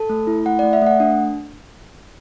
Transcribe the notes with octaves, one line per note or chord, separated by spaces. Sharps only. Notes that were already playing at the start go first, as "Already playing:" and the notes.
Already playing: A4 A5
A3
E4
A3 F#5
A3 D5
E5
A3 F#5
D4